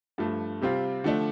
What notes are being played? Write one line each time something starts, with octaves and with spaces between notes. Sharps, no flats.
G2 F3 A3
C3 G3 C4 F4
D3 F3 A3 D4